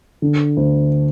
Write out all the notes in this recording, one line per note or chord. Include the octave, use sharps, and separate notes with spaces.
D3
D2